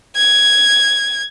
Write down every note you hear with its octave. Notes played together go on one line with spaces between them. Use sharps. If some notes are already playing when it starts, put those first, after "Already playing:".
G#6